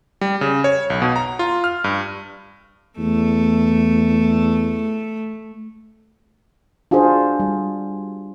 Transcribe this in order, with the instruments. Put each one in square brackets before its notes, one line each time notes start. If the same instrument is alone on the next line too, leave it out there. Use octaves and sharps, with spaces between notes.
[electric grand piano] G3
C#3
C#5
B1
B2
A#5
F4
F6
G2
[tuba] E2 [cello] A3
[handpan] D4 F4 F#4 G#4 C5
G3